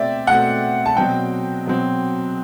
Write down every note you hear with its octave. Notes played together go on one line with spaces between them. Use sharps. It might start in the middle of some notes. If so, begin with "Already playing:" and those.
Already playing: B2 A3 C4 D5 E5 G5
B2 A3 C4 F#5
A5
B2 F#3 C4 G5
B2 F#3 C4